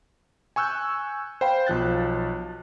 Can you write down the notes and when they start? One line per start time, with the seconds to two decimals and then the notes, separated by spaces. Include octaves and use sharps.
0.56 G#5 C#6 E6 F#6 G6
1.41 C5 F5 G5 B5
1.67 B1 F3 F#6 A6